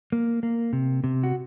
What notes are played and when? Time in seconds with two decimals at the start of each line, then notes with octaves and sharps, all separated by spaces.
0.12 A#3
0.43 A#3
0.73 C3
1.04 C3
1.23 F#4